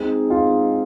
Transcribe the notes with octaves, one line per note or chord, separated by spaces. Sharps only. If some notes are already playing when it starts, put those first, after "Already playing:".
Already playing: G#3 C4 D#4 G#4
F4